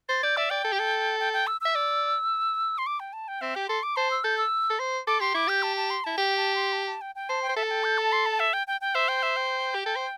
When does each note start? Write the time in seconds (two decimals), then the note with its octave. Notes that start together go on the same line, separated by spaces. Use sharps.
0.09 C5 A6
0.23 D5 G6
0.37 D5 E5
0.50 D5 G5
0.64 A4
0.72 G4
0.80 A4
1.20 G5
1.33 G5
1.47 E6
1.61 E5 E6
1.75 D5
2.78 C6
2.87 D6
3.00 G5
3.13 A5
3.28 G5
3.41 C4 E5
3.55 G4 G5
3.68 A4 C6
3.83 D6
3.96 C5 A5
4.11 E6
4.24 A4 G6
4.38 E6
4.70 A4
4.79 C5
5.07 A4 D6
5.21 G4 C6
5.34 E4 D6
5.47 G4 G6
5.63 A5
5.77 A5
5.90 C6
6.04 E4 A5
6.17 G4 G5
6.37 A5
6.56 C6
6.73 A5
6.87 A5
7.01 G5
7.15 G5
7.29 C5 A5
7.42 G5
7.49 C5
7.56 A4 E5
7.63 A5
7.71 G5
7.84 G6
7.98 A5
8.12 C6
8.26 A5
8.40 E5
8.53 G5
8.67 G5
8.81 G5
8.95 C5 E5
9.08 G5
9.23 E5
9.37 G5
9.74 G4
9.86 A4
9.96 C5